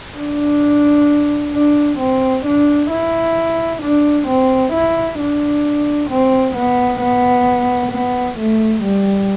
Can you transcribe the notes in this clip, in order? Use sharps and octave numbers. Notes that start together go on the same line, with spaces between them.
D4
D4
C4
D4
E4
D4
C4
E4
D4
C4
B3
B3
B3
A3
G3